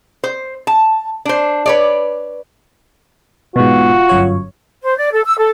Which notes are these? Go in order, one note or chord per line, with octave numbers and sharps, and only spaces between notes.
C5
A5
D4 C5
B4 C#5 D5
G#2 B2 F4 F#4
G1 F#2 C#5
C5
D5
A4
E6
A4